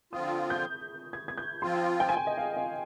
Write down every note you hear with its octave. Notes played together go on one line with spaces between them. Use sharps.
D3 F3 C4 F4 D#6
G6
G#6
G#6
G6
F3 C4 F4 C6
G5
G#5
G5
D#5
F5
D#5